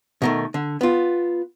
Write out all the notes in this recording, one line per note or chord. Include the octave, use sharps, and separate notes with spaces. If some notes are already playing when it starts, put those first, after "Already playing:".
B2 D#3 A3
D3
B3 F4